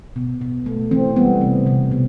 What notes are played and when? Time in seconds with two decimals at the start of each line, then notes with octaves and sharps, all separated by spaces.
0.16 B2
0.41 B2
0.66 A3
0.91 E3 C4
1.16 G3 B3
1.41 C3
1.67 C3
1.91 B2